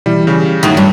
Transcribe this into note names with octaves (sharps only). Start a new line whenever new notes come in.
B2 E3 G3 E4
C#3 G3
F#2 A2 D#3 F#3 E5
G2 C#5 B5